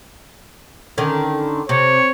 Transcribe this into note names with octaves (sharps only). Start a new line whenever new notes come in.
D3 D#3 C#4
C3 C#5